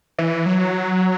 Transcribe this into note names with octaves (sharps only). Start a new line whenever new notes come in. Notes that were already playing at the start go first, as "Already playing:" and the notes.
E3
F#3